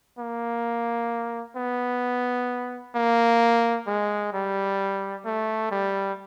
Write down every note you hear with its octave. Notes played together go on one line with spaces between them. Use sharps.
A#3
B3
A#3
G#3
G3
A3
G3